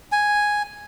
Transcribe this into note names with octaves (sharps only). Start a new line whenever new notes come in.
G#5